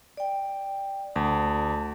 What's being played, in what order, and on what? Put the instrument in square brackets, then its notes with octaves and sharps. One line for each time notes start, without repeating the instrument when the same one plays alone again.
[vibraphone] D5 G5
[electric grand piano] D2 [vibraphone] A5